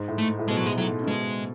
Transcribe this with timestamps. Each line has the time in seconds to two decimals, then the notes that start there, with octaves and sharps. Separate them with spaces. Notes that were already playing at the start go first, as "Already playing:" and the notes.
Already playing: G#2
0.08 A2
0.18 A3
0.39 A2
0.48 B2 G#3
0.57 F#3
0.66 G#3
0.78 A2 F#3
1.03 C#3
1.07 B2 G#3